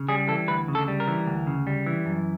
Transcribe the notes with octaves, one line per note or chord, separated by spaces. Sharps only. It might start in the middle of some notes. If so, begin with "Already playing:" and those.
Already playing: C#3
G3 G#4
E3 A4
D2 B4
C#3
A4
G3
A#4
E3
D2
C#3
G3
E3
F#2